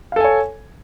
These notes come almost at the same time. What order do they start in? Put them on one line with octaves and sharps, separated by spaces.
F5 A4 G#5 C#5